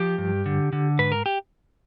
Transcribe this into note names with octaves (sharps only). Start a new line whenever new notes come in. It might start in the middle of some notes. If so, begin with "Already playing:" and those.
Already playing: F3 G4
G2
D3
D3
G#2 B4
A#4
G4